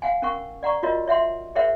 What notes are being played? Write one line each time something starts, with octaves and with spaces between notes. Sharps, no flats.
F5 F#5 G#5
C#4 A#4 F#5 C#6
D5 F#5 A#5 C#6
F4 F#4 A#4 C#5 D#5
C#5 E5 F#5 C6
G#4 A#4 C5 C#5 E5 F#5